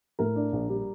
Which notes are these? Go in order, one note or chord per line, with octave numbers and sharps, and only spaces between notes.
A2 A#4
D4
A#1
G3